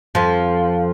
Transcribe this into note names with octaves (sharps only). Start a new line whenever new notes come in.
F2 F3